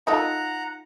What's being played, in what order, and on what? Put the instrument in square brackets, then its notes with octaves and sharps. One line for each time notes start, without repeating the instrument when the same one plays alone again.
[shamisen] D#4 F4 A4 [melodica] F#5 A#5